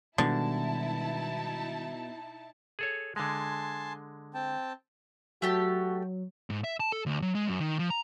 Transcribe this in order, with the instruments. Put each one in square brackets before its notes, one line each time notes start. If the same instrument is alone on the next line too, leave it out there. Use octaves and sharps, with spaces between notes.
[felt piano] B2 [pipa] D3 [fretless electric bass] D#3 G3 G#3 [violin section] D#4 E4 A5
[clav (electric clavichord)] G#4 A4 C#5
[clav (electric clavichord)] D3 G#3 [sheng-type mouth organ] G#5 A5 C6
[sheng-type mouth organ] C4 G5 A5
[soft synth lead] F#3 [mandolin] A3 G4 A5 [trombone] F#4
[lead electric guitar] G#2
E5
A5
A4
D2
F#3
G#3
F#2
D#3
F3
A#5